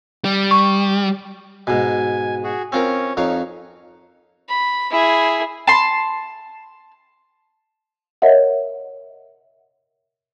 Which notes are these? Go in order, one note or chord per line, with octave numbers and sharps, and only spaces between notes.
G3
C#6
G#2 B2 G#5
F#4 G#4
C4 C#4 F4 A#4 C#5
F2 D#4 C#5 F5
B5
E4 G#4
A5 C6
A#4 C#5 D#5 E5 F#5